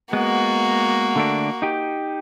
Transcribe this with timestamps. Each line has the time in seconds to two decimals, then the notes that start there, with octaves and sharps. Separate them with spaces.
0.13 G#3 A#3 B3 F#4
1.16 D3 A3 D4
1.62 D#4 G4